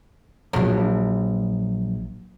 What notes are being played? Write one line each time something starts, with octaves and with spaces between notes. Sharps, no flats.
A#1 F#3